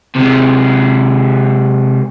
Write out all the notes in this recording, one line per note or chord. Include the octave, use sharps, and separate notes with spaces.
C3 G#3